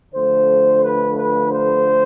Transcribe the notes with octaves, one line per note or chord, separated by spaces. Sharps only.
D3 F3 A3 C5
B4
B4
C5